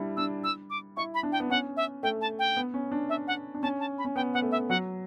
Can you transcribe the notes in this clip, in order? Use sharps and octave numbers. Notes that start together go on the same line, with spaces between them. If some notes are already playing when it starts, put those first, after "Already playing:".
Already playing: G3 D4 E4
D4 E6
E6
D6
E4 C#6
B5
D4
G5
B3
C#4 F#5
E5
A3 G5
A5
G5
B3
C#4
D4
E5
F#5
D4
C#4 A5
A5
B5
C#4
B3 G5
B3 F#5
A3
E5
F#3 F#5